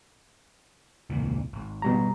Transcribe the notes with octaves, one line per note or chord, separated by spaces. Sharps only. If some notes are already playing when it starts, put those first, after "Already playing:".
E1 C#2 A#2
G#1
B2 G3 A#5